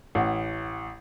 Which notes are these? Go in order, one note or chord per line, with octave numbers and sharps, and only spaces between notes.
A1 F#5